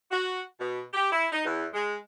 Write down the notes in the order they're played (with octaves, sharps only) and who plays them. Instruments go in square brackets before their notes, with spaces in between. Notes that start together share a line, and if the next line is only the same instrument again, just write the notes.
[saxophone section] F#4
B2
G4
E4
D#4
E2
G#3